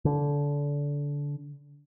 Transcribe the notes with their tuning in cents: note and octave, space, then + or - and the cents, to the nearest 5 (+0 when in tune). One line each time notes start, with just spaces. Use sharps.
D3 -25